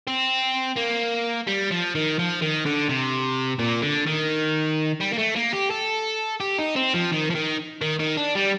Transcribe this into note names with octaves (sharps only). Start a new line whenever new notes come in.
C4
A#3
G3
F3
D#3
F3
D#3
D3
C3
A#2
D3
D#3
G3
A#3
A3
A#3
G4
A4
G4
D#4
C4
F3
D#3
F3
D#3
D#3
D#3
D4
G3